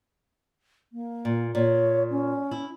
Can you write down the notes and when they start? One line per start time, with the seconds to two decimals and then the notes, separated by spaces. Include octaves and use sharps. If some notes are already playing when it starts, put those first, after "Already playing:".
0.93 A#3
1.25 A#2
1.55 A#2 C#5
2.10 C#4
2.51 E4